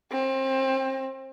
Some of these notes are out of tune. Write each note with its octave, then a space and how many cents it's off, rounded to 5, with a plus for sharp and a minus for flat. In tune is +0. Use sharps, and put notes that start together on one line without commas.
C4 +30